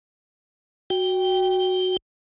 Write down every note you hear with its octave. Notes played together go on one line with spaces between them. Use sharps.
F#4 G5